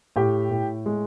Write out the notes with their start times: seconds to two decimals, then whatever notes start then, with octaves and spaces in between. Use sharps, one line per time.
0.16 A2 G4
0.51 A2
0.86 G#3